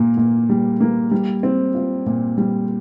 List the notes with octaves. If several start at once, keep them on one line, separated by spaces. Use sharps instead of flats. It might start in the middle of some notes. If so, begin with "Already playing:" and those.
Already playing: A#2 A#3
A#2
G3
A#3
G3
C4
F4
A#2
G3